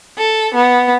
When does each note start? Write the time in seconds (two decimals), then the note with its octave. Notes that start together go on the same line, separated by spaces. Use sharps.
0.18 A4
0.54 B3